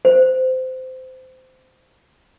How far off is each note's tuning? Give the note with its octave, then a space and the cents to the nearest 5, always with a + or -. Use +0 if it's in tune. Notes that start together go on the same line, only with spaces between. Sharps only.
C5 -20